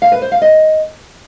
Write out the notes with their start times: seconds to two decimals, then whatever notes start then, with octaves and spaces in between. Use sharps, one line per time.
0.02 F5
0.12 B4
0.22 C5
0.32 F5
0.42 D#5